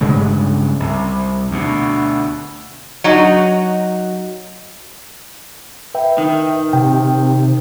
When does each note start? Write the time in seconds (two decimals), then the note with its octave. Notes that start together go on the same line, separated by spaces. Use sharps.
0.01 G2 C#3 G#3 A3
0.80 C2
1.51 D2 B2
3.04 F#3 D#4 F#4
5.94 B4 E5 G5
6.18 D#3
6.73 C3 G5